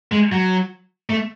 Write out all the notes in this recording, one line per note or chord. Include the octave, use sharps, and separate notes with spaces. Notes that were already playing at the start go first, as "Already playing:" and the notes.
G#3
F#3
A3